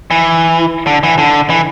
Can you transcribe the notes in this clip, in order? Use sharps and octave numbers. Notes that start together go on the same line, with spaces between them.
E3
D3
E3
D3
E3